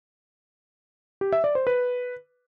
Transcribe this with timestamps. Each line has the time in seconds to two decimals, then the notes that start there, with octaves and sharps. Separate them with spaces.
1.21 G4
1.33 E5
1.44 D5
1.55 C5
1.67 B4